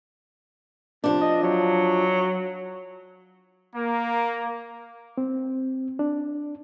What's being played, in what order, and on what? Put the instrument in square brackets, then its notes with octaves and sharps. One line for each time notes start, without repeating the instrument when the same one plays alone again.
[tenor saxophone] C3 [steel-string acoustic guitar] F3 D4
[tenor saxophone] D#5
F#3
[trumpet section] A#3
[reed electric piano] C4
D4